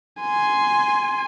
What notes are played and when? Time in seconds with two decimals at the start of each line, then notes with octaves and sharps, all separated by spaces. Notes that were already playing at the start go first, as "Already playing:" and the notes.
0.21 G#5 C6